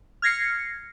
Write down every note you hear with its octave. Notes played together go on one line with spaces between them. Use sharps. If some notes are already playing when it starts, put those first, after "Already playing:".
F6 G#6 A#6 C7 C#7